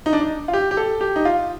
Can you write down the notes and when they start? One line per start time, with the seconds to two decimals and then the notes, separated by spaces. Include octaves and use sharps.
0.06 D#4
0.13 D4
0.20 D#4
0.48 F4
0.53 G4
0.71 G4
0.77 A4
1.01 G4
1.16 D#4
1.25 F4